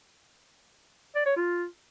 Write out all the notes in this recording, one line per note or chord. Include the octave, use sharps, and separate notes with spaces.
D5
C#5
F4